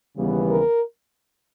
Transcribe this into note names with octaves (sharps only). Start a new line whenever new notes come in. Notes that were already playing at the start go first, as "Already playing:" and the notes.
D#2 C#3 E3 G3 B3
A#4